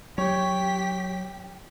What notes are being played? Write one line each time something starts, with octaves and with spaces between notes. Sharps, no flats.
F#3 G4 C#5 G5 C#6 B6